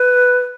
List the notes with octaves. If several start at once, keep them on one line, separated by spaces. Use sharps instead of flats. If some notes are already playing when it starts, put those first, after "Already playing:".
Already playing: B4